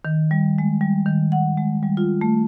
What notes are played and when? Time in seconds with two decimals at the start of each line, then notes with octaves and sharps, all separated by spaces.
0.05 D#3
0.31 G3
0.58 G#3
0.81 G3
1.06 D#3
1.32 F#5
1.57 G#3
1.83 G3
1.97 F4
2.21 A3